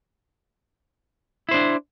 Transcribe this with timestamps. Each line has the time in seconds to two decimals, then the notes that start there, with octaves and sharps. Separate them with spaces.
1.49 E4
1.51 C5
1.54 D4